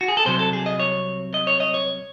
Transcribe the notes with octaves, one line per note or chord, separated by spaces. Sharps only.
F#4
G#4
A4
C2 C3 F#3 C4 C5
A4
G#4
D#5
C#5
D#5
C#5
D#5
C#5